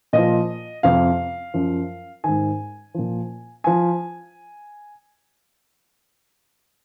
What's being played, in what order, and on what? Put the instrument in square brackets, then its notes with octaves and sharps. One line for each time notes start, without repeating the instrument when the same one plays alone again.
[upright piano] A#2 F3 D#5
F2 C3 F3 F5
F#2 F3
G#2 D#3 G#5
A#2 F3
F3 G#5